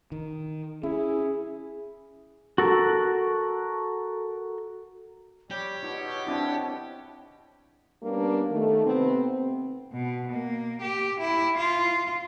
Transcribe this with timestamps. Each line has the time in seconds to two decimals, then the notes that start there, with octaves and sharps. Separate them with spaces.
0.12 D#3
0.83 C#4 E4 G#4
2.58 F#4 A4 A#4
5.51 G3 G4 C#5
5.83 B2 D#4 F4
6.27 C4 D4 E4
8.03 G3 A#3 B3 C#4 D4
8.51 D#3 A3
8.86 C3 B3 C4
9.92 B2
10.32 A#3
10.81 G4
11.20 E4
11.57 F4